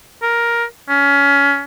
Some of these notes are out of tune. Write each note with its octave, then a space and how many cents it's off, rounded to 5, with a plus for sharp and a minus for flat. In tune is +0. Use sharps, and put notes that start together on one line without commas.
A#4 +10
C#4 +25